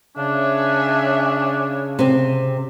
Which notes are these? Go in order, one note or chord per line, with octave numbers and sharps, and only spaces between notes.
C#3 D4 C#5 E5 G#5
C3 C4